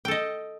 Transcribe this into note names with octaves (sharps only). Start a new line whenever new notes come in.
A4 D#5 G5